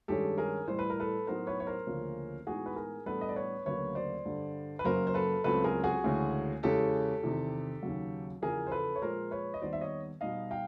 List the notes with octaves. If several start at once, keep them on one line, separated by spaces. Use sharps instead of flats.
G2 D#3 G#3 C#4 G4 A4
G#4 A#4
A2 E3 G3 C5
B4
A#4
A4 B4
A2 F#3 B3 D#4 A#4 C5
B4 C#5
C#5
A#4 C5
D2 C#3 F3 A#3 C#4
A2 E3 G#3 B3 D#4 F#4 G#4
B4
G#4 A#4
A2 E3 G3 B3 D4 A4 B4
D#5
D5
B4 C#5
D2 C#3 F#3 A#3 B4 C#5
C5 D5
G2 D3 G3
B4
F#2 C#3 F#3 A#3 A#4 C5
C5
A4 B4
C#2 C#3 F#3 A3 C4 A4 B4
G#4 A#4
F#4 G#4
D2 C#3 E3 G#3 C#4
E2 C#3 E3 G#3 C#4 G4 A4
E2 C3 D#3
D#2 C#3 F#3
E2 C#3 F3 G#4 A#4
C5
A4 B4
C#5
A#2 F3 G#3 A#4 C5
B4 C#5
D#5
D#2 D#3 G3 B3 D#4 C5 D5
E5
C#5 D#5
B2 G3 B3 D#4 D#5 F5
F5 G5